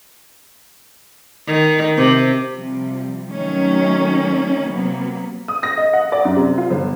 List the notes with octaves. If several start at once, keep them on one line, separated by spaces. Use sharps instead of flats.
D#3
C3
C3 F3 G3
D#3 F#3 A3 C#4
C3 F#3 A#3 B3
D#6
A#6
D#5
F#5
D5
F#2
C3
F4
G1